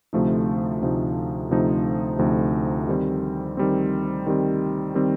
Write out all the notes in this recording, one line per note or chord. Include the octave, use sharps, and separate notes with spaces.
D2 C3 F3 A3 D#4
D2 C3 F3 A3 D#4
D2 C3 F3 A3 D#4
D2 C3 F3 A3 D#4
D#3 G3 C4
D#3 G3 C4
D#3 G3 C4
D#3 G3 C4